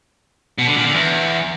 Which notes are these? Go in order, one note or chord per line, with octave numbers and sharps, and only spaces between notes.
B2
D3
A#2
D3
E2